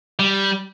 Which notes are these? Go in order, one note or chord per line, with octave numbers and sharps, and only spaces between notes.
G3